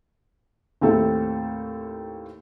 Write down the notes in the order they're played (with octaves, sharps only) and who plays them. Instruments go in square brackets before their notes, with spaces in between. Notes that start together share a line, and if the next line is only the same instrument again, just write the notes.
[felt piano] D#2 A2 C4 A4 E5